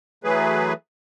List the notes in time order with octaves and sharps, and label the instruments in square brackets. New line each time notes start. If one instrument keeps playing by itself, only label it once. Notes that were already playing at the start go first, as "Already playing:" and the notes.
[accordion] E3 F#3 A3 G#4 B4